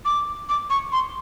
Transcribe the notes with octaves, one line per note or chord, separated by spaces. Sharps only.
D6
D6
C#6
C6